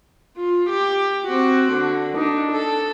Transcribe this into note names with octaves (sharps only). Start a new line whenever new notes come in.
F4
G4
C4 F#4
D3
D4 D#4
A4